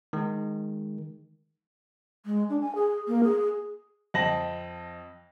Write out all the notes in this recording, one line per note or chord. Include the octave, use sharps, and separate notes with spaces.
D#3 G#3
G#3
D4
G#5
G#4
A#3
G#4
F2 C4 D#5 A5 A#6 F#7